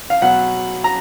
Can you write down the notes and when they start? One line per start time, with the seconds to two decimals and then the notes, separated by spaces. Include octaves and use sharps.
0.10 F5
0.22 B2 F#3 F#5
0.84 A#5